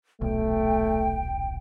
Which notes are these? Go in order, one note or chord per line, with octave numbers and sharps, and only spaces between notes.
D#1 B1 A3 G5